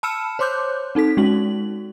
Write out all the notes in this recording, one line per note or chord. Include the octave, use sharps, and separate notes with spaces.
A5 B5 E6 F6 C#7 E7
C5 C#5 C6 D6 F#6 G6
C4 D#4 A4 B6
G#3 C#4 F#4 F#7